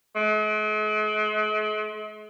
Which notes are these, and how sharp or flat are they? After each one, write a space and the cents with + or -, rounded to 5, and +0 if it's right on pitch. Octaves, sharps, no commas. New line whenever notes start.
G#3 +45